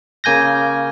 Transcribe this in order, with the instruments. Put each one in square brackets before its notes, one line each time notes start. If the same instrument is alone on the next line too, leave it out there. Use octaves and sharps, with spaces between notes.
[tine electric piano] C#3 A#3 G#5 G6 A#6